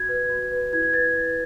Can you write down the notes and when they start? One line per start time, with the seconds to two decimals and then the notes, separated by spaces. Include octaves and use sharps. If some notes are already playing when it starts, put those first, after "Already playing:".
Already playing: F#4 G#6
0.09 B4
0.30 F#4
0.52 B4
0.73 E4 G#6
0.83 G#6
0.93 B4 A6